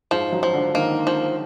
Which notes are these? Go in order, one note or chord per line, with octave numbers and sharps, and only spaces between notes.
G#2 F3 G#3
F#2 F#3
F3
D3 D4
D#3 A#3 D#4
F3